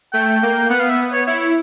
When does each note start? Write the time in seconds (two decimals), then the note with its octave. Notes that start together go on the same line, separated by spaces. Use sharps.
0.13 A3 G5
0.43 A#3
0.70 B3 F#5
0.80 F5
0.90 E5
1.12 C#5
1.26 E4 C#5
1.40 C#5